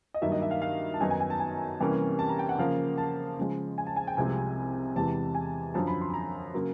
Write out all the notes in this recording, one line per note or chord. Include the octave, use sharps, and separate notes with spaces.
D#5
G2 D#3 F#3 A#3 E5
D#5
E5
F5
F5
A5
F#2 D#3 F#3 B3 D#4 G#5
G#5
G#5
A5
G#5
C3 E3 G3 A#3 C#4
A5
A#5
G5
F#5
C#3 F3 A#3 F5
A5
C#3 F3 G#3
G#5
A5
G#5
G5
C2 C3 F3 G#3 C4 G#5
E2 C3 E3 G#3 A5
G#5
F#2 D3 F3 A5
B5
C6
B5
A#5
C#3 F#3 A#3